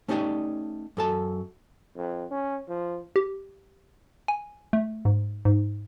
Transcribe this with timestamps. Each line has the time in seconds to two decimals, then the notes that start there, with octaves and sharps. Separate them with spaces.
0.08 A3 C#4 D#4 G4 D5 D#5
0.97 F#2 A4 A5
1.96 F2
2.31 C#4
2.68 F3
3.16 G4
4.28 G#5
4.73 A3
5.05 G#2
5.45 G#2